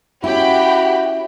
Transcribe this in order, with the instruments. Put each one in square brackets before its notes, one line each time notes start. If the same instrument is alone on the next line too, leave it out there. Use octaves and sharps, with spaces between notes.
[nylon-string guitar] C#4 E4 [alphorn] F#4 [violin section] G4 G5 B5